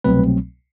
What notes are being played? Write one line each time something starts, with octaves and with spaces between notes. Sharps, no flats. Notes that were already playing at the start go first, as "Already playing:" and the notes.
C2 B2 F#3 A3 C4 B4